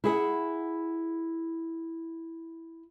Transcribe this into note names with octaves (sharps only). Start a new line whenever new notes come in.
E4 G#4 F#5